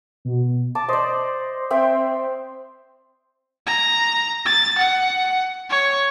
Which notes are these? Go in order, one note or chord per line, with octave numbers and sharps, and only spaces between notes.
B2
A5 D6
C5 D5 D#5
C4 E5 G5
A#5
A6
F#5
C#5